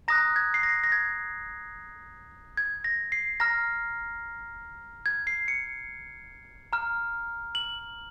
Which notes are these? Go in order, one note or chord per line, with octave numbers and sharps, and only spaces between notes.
A#5 D#6 F#6 A#6
G#6
C7
A#6
A#6
G#6
G#6
A#6
C7
A#5 F6 A#6
G#6
C7
C#7
A#5 F6
F#7